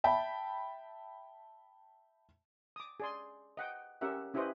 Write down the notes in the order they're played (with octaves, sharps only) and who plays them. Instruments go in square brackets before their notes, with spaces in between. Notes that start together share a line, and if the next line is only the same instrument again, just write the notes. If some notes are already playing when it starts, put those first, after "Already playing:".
[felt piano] E5 G5 A5 B5
[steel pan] D6 D#6
G#4 D5 C6
D#5 F#5 G5
C#4 G4 A#4 E5 F#5
C#4 E4 G4 B4 C5 D#5